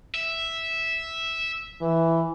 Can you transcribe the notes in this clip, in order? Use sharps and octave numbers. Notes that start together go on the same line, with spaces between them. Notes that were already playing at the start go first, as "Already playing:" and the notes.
E5
E3